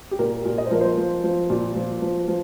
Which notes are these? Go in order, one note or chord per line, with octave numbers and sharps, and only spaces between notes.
G4
A#2 A#4
A#2
D#5
C5
F3 A#4
C5
F3
F3
A#2
F3
F3
F3